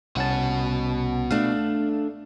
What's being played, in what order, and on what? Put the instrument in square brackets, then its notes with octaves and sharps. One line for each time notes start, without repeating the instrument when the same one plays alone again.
[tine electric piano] C2 C#4 A5 [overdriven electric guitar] B2 F#5
[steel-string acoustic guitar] A3 D4 [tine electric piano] F5